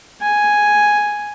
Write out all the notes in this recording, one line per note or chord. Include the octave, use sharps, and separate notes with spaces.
G#5